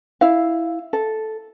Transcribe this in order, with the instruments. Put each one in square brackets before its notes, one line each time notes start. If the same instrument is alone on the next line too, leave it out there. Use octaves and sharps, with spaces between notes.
[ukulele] E4 F5
A4